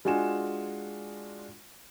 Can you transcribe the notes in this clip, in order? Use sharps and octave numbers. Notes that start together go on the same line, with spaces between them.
G#3 D4 F4 F#4 G#5 E7